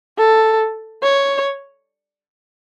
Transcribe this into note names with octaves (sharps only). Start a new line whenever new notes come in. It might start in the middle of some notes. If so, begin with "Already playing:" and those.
A4
C#5